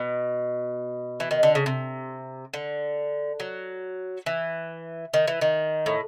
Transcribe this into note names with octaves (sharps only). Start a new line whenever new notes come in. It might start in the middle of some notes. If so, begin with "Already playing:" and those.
Already playing: B2
E3
D#3
D3
C#3
C3
D3
F#3
E3
D#3
E3
D#3
A2